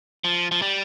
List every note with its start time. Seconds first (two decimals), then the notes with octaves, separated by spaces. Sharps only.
0.24 F3
0.51 F3
0.62 G3